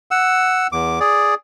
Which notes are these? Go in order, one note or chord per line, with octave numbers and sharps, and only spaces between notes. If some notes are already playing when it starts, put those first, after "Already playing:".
F#5 E6
E2 D6
G#4 D5